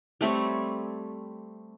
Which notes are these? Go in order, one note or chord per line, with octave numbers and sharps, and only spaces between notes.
G3 A3 C4 C#5